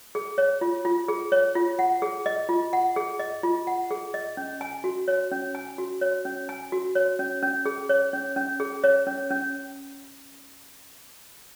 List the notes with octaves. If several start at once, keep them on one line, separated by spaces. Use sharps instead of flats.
G#4
C#5
F4
F4
G#4
C#5
F4
F#5
G#4
D#5
F4
F#5
G#4
D#5
F4
F#5
G#4
D#5
C#4
G#5
F#4
C#5
C#4
G#5
F#4
C#5
C#4
G#5
F#4
C#5
C#4
C#4
G#4
C#5
C#4
C#4
G#4
C#5
C#4
C#4